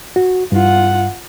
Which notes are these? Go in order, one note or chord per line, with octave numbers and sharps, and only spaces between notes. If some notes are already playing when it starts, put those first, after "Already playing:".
F#4
G2 F4 F#5